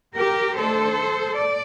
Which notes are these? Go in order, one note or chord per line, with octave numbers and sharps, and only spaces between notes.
G4 A#4
D#3 A3 D4 A4 C5
D5